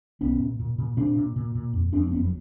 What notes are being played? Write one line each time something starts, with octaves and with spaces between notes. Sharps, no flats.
B1 B3 C#4
A#2
A#2
A#2
A#2 C4 D4
A#2
A#2
A#2
F2
F2 C4 D4
C4
F#1 B3 C#4
F#3